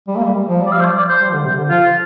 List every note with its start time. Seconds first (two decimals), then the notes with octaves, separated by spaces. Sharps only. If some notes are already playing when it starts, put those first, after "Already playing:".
0.08 G3
0.16 A#3
0.24 G3
0.48 F3
0.62 G3 D5
0.72 F5
0.75 F3
0.81 C5
0.85 D5
0.97 D5
1.09 C5
1.21 G3
1.29 F3
1.33 D3
1.45 C3
1.58 D3
1.70 F3 F4